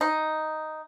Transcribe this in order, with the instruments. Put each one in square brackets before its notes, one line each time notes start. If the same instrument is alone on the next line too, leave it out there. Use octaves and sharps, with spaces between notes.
[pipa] D#4